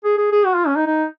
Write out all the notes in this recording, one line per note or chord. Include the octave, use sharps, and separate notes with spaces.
G#4
G#4
G#4
F#4
F4
C#4
D#4
D#4